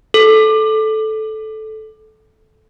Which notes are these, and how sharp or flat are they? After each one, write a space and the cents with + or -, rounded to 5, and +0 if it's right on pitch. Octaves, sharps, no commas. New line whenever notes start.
A4 -15